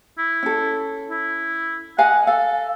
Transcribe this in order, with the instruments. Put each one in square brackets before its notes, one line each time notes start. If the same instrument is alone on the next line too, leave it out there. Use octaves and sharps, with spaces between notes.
[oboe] E4
[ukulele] C#4 A4
[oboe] E4
[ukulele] D#5 F5 G#5 [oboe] F#5
[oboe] A4 [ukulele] F5